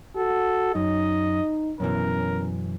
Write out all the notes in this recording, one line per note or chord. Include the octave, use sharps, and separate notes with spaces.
F#4 A4
F#2 D#4 D#5
F#2 B2 E3 C#4 A#4